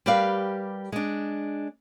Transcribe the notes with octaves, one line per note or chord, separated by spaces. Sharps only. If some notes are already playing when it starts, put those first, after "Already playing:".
G3 G4 A#4 B4 D5 F5
G#3 D4